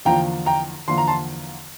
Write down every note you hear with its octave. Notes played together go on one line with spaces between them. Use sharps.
E2 D3 F3 A#3 G5 A#5
G5 A#5
E2 D3 F3 A#3 C6
A#5
A5 C6